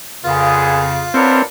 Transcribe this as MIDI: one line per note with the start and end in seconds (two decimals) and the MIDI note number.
0.25 1.06 41
0.25 0.85 46
0.25 1.06 49
0.25 0.85 59
0.25 1.45 65
0.25 0.85 68
1.14 1.40 59
1.14 1.42 60
1.14 1.40 62
1.14 1.41 64
1.14 1.41 70
1.14 1.40 71
1.14 1.41 73